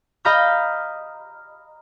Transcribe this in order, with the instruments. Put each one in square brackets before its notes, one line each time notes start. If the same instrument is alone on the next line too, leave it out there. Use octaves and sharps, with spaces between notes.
[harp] D#5 F5 A#5 B5 F6 G6